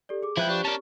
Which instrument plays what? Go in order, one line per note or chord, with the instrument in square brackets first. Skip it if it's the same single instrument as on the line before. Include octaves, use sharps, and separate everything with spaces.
[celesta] G4 A4 D5
G#4 D6
[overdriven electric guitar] B1 E4 [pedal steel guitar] F3 B4 G5 [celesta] E5
[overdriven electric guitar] D4 [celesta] G4 C#6
[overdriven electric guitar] C#4 D4 [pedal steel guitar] A#4 A5